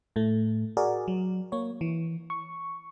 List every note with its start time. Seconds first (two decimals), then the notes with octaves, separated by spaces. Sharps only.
0.16 A2 A3
0.77 F#4 G#4 A#4 D5
1.08 F#3
1.52 A#3 C#5
1.81 E3
2.30 C#6